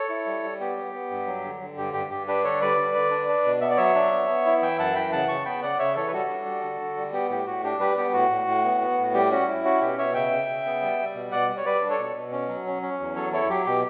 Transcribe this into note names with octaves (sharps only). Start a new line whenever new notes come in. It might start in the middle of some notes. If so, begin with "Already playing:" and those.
Already playing: A4 C#5
E4
G3
G3
B3 G4
B3
B3
G2
F#3
D3
D3
G2 G4
G2 G4
G2 G4
D4 G4 B4
D3 A4 C#5
G3 B4 D5
D3
D3
D4
D4
B2
B3 E5
D5
F#3 C#5 E5
D4
B3
B3
E4
E3 E5 G5
F#2 F#5 A5
E3 G5 B5
C#3 F#5 A5
C#3 A5 C#6
B3 G5 B5
C#3 D5 F#5
C#3 C#5 E5
E3 A4 C#5
B4
G3 F#4 A4
D4
G3
D3
D3
G3
B3 G4
A2 G4
A2 F#4
D4 G4
G3 G4 B4
B3 G4
A2 F#4
A2
A2
B3
B3
A2
G3 G4
C#4 F#4
E4
C#4 F#4
B2 G4
B2 C#5 E5
C#3 E5 G5
C#3
C#3
B3
G3
G3
B2
B2 D5 F#5
G3
C#5
G3 B4 D5
D4
A4 C#5
B2
B2
C#4
F#3
C#4
C#4
E2
F#3 A4 C#5
E4 A4 C#5
F#3 G4
B2 G4